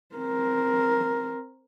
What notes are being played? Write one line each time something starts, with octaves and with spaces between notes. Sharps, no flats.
C4 A#4